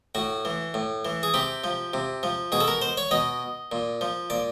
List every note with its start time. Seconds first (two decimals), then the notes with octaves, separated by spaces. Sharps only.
0.15 A2 F#4
0.45 E3
0.74 A2
1.05 E3
1.23 G#4
1.34 C3 G4
1.64 F3
1.94 C3
2.23 F3
2.52 B2 G#4
2.60 A4
2.68 A#4
2.82 C5
2.97 C#5
3.11 B2 D#5
3.72 A#2
4.01 F3
4.30 A#2 D5